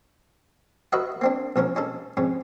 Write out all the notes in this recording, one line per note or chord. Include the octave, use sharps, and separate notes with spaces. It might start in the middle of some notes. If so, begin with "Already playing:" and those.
F#4 A#4 B4 D#5 E5 F#5
A#3 C4 D4
A#1 F3 C#4 A#4
C#4 D#4 A4
F2 G#2 C#4